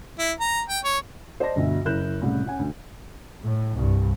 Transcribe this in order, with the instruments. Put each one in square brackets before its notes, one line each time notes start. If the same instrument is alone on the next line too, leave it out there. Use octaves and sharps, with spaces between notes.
[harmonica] E4
A#5
G5
C#5
[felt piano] C5 D5 D#5 A5 A#6
G1 D2 B2 D#5 E5
F#1 E4 A#4 F#6 G6 E7
C2 A2 C#3
C#4 F#5 G#5
D2
[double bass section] A2
C2 G2